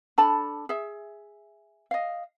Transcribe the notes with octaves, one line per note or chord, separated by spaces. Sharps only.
D4 A4 A5 B5
G#4 E5
D#5 F5